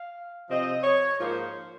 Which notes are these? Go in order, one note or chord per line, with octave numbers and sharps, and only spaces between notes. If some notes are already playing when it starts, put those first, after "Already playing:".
Already playing: F5
C3 F3 C4 D#5
C#5
G#2 F3 A#3 D#4 C5